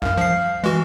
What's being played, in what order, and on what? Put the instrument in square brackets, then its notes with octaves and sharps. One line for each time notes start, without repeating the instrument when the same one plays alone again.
[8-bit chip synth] C2 F#2 [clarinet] F5
[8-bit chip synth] F3 C7
[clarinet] E3 [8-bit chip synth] G#3 F#4